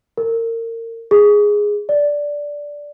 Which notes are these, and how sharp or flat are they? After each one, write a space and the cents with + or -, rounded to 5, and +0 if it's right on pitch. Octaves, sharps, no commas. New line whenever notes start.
A#4 -30
G#4 -5
D5 -5